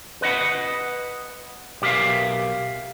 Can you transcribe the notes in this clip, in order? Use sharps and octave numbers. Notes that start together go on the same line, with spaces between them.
B4 D#5 F#5 B5
B1 G4 A#4 E5 F5